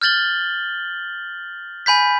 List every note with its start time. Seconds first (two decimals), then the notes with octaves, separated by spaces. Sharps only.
0.02 F6 G6 A6 F#7 G7
1.86 G#5 B5 G6 B6